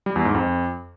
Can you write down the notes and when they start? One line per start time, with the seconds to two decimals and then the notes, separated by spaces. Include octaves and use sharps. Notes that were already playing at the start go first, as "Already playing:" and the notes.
0.06 G3
0.16 E2
0.25 G#2
0.35 F2